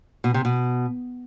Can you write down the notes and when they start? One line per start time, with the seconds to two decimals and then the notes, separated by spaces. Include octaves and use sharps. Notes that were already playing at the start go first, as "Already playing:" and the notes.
0.24 B2
0.34 C3
0.45 B2